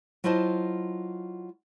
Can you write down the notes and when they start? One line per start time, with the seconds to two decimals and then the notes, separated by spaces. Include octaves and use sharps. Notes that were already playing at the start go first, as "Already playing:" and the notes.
0.24 F#3 E4 F4 C5 D#5 A5